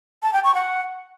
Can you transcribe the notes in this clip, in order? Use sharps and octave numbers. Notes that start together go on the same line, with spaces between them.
A5
G5
C#6
F#5